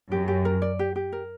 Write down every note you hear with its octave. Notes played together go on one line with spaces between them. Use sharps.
F#2 G4
G4
A#4
D5
G4
G4
A#4